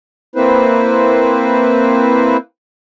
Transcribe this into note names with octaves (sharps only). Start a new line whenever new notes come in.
A#3 C4 E4 B4 C5